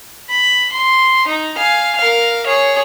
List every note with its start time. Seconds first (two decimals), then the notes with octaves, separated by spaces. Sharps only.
0.30 B5
0.72 C6
1.27 D#4
1.58 F5 G#5
1.97 A#4 F5
2.46 G#4 C#5